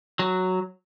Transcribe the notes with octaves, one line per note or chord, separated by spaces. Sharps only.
F#3